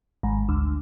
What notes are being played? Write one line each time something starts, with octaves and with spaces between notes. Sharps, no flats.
G#1
D2